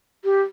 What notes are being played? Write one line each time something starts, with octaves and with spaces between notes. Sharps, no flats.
G4